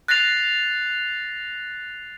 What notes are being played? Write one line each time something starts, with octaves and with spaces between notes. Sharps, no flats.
F#6 A6 A#6 C7 F7